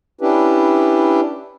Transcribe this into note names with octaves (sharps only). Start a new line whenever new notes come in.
C#4 D4 E4 G4 B4